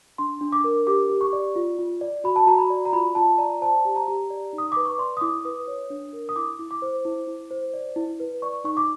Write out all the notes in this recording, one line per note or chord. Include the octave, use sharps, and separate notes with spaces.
D4 C6
D4
D6
A#4
G4 D6
G4
C#6
D5
F4
F4
D5
F#4 B5
A5
F#4 A#5
B5
D5
A#5
F4 B5
F4 A5
D5 A#5
C5 A5
G4
A#5
G4
D5
D#4
D#6
B4 D6
C#6
D5 C6
D#6
E4 D6
B4 D#6
C#5
D4
A#4
D#6
E4 D6
E4
D6
C5
E4
E4
C5
D5
E4
B4
D5 C#6
D#4 C#6
D6